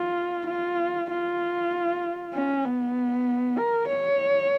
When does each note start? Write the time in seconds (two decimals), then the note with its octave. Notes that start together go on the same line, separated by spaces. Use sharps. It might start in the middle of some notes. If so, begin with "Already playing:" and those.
Already playing: F4
0.47 F4
1.10 F4
2.33 C#4
2.65 B3
3.58 A#4
3.88 C#5